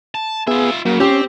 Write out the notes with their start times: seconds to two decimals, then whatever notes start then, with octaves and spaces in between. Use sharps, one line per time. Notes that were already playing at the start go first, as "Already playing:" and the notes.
0.15 A5
0.48 B3 F4 G#4 E5
0.85 C#3 F#3 A#3
1.00 C4 C#4 G4